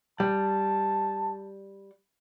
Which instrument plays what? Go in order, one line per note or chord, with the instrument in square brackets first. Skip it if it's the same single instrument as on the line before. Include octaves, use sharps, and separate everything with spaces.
[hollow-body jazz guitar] G3 [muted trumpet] A5